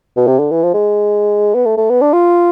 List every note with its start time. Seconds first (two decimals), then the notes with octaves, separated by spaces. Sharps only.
0.17 B2
0.27 C3
0.39 D3
0.51 E3
0.63 F3
0.74 G#3
1.55 B3
1.66 A3
1.77 A3
1.90 B3
2.01 D4
2.13 F4